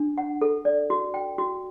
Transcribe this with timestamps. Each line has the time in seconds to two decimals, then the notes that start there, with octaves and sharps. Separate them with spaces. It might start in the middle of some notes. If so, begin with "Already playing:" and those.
Already playing: D4
0.18 F#5
0.41 A4
0.65 D5
0.90 F#4
1.14 G5
1.38 F#4